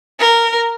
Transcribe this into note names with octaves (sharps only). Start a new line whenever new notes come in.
A#4